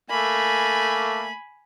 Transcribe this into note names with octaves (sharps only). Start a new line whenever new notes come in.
A3 A#3 G#5 B5